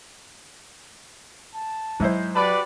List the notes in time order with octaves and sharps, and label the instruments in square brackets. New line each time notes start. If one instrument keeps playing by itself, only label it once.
[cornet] A5
[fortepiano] G#2 E4 C5 [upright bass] F#3
[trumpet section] F#4 G4 D5 [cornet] B4 [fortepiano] A5 B5 D6